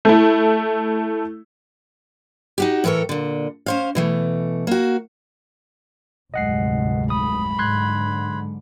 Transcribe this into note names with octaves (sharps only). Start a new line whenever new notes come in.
A3 E4
D#4 F#4 G4
A2 E3 A4 A#4 C#5
A#2 D3
C#4 C5 F5
B2 E3 A3
A#3 F#4
F1 D2 G#2 F#3 G#3 D#5 F#5 C7
B5 D#6
G#2 D3 C6 F#6 G#6